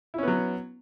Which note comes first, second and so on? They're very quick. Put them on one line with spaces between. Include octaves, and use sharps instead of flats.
E4 C#4 B3 F#3